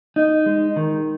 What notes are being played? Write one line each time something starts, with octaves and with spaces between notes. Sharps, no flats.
D#4
G#3
D#3